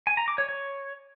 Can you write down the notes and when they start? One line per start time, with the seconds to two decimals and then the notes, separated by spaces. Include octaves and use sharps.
0.07 G#5
0.17 A#5
0.28 D6
0.38 C#5
0.49 C#5